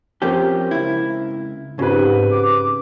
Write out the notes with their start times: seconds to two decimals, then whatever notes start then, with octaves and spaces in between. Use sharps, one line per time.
0.22 F3 C4 C#4 G4 A#4
0.71 C#2 E4
1.79 G#2 C#3 C4 G4 B4
2.32 D6